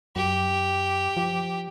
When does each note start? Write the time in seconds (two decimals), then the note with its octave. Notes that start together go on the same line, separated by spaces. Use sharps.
0.16 F#2 G4
1.17 F3